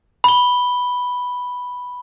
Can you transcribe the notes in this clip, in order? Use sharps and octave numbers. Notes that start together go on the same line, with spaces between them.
B5 G7